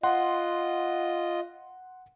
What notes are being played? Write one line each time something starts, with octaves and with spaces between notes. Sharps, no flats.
F4 D#5 F#5 C6